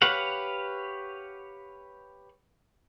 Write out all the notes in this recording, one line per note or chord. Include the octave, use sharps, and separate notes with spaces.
G4 B4 C#5 F5 F#5